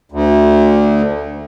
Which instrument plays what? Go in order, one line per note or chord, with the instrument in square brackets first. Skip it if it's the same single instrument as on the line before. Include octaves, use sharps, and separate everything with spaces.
[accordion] D2